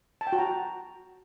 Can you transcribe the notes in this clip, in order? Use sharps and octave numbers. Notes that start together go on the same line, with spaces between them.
A5
G5
F#4
A#5